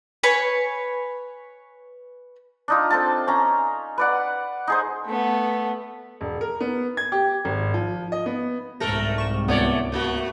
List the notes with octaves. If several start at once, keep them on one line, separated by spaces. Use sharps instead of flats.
B4 C#5 G#5
D4 D#4 F4
C4 A4 A5
C#4 A#5
B4 D5 F#5
D#4 G#4 C5
A3 B3
E1
A#4
B3
G#6
G4
G#1
F3
D#5
B3
C2 G#2 A3 A4 A#4 A#6
C#6 E7
C#2 A3 B3 C#5 D5
A3 A#3 F#4